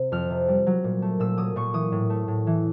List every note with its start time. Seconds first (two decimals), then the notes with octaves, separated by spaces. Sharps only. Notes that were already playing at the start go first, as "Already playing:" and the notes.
Already playing: C3
0.12 F2 F6
0.30 C3
0.48 G3
0.66 F#3
0.84 A#2
1.02 A3
1.20 A#2 E6
1.38 F#3 D#6
1.56 A#2 C#6
1.74 E3 D#6
1.92 A2
2.10 A3
2.28 A2
2.47 E3